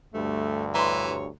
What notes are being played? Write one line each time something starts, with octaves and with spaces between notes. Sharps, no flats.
D2 G2 A3
E3 C#5 A#5 C6